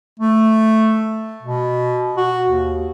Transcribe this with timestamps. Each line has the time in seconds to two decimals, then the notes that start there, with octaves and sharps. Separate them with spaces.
0.20 A3
1.43 B2
2.17 F#4
2.50 D#2